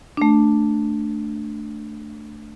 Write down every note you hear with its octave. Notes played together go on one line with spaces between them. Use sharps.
A3 D4